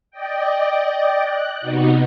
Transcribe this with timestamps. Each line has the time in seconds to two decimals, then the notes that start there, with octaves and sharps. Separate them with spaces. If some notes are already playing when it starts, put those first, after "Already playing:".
0.11 D5 D#5 G5
1.22 F#6
1.61 C3 B3 D#4 F#4